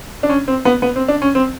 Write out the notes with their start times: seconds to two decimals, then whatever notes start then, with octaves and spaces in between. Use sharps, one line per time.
0.23 D4
0.29 C#4
0.48 C4
0.65 B3
0.82 B3
0.96 C4
1.08 D4
1.22 C#4
1.35 C4